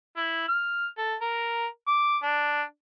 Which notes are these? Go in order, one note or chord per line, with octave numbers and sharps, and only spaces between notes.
E4
F6
A4
A#4
D6
D4